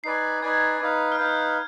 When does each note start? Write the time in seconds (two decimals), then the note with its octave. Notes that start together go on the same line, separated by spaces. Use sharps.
0.04 D#4 B4 D5 G#5 C7
0.42 D#4 B4 D5 G#5 G#6
0.80 D#4 B4 F5
1.12 F6
1.19 D#4 B4 F5 G6